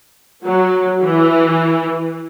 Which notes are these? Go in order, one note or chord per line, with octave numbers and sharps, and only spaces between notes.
F#3
E3